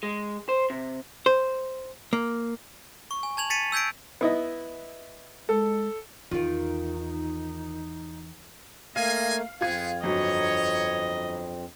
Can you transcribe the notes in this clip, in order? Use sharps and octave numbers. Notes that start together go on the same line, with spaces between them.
G#3
C5
C3
C5
A#3
C#6
G#5
A5 G#6 F7 F#7
A6 B6 C#7 D#7 F7
E6 G6 G#6 B6 D7
B3 E4 D#5
G#3 A4
E2 D#3 D#4 F4
A3 A#3 D#5 F5 G#5
F2 B3 C4 F4 G#4 G#6
G1 F#3 C#5 D#5